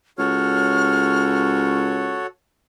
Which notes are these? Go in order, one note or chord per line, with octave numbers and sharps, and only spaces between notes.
C#2 F#4 A4 C#5 F6